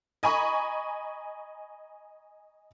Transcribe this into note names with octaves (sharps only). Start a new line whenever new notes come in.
D#5 G#5 A#5 B5 C#6